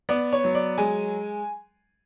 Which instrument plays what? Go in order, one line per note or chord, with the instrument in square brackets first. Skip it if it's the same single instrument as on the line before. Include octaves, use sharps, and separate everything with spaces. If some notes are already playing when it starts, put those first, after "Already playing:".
[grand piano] B3 D5
C#5
F#3
D5
G#3 G#5